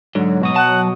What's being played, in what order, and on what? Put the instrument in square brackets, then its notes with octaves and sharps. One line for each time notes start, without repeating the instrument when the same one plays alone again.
[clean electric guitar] G#2 [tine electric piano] D3 [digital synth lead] F#3
[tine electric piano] B2 F#4 D#6
[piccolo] F#5 [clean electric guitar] A5